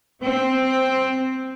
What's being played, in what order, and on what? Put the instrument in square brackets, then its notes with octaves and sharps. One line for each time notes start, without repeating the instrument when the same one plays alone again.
[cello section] C4